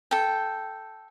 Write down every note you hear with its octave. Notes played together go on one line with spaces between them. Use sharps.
A4 G5